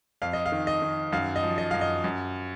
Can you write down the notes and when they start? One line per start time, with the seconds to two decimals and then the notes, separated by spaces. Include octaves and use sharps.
0.22 F2 F5
0.33 D#5
0.46 F5
0.52 D#3
0.67 D#5
0.82 D#3
1.12 F#2 F5
1.36 D#5
1.43 F3
1.58 D#5
1.71 F#2 F5
1.81 D#5
2.04 F#2